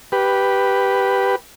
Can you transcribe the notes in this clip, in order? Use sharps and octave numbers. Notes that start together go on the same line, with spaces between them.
G4 B4